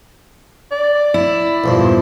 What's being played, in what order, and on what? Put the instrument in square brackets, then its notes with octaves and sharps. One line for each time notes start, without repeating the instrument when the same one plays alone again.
[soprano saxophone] D5
[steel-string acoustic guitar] E4
[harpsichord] A#1 E2 G2 [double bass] A#2 F3